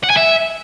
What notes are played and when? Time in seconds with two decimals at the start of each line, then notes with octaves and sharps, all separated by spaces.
0.04 F#5
0.10 G#5
0.17 E5